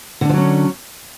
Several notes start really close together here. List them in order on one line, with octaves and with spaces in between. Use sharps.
D3 D4 F3 F#3 C#4